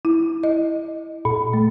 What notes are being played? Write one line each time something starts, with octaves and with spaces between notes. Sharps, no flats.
E4
D#5
A#2
A3